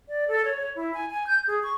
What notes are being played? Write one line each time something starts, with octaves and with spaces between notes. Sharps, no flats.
D5
A4
C#5
C#5
E4
G#5
G#5
G6
G#4
C#6